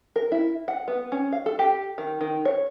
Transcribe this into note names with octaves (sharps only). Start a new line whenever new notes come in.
A#4
E4
F#5
B3
C#4
F5
A4
G4
D#3
D#3
C#5